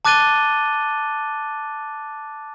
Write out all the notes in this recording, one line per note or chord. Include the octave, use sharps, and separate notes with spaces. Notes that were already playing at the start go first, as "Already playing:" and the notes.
A5 D6 F#6 A6 D#7 G7